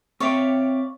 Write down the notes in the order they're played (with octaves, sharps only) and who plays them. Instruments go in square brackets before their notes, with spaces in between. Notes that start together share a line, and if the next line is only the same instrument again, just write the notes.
[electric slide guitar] C4 E5 G5 [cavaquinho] C#5 D5 F5